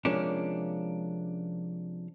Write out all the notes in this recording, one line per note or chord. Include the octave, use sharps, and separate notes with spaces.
C3 F3 G#3 A#3 C#4 D4